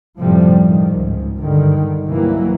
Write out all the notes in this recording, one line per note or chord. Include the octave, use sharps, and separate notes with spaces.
F#2 A2 C3 F3 G3
C2 D#3
C#2 G#2
G2 D3 D#3
C2 G2 C3 E3 F#3 A#3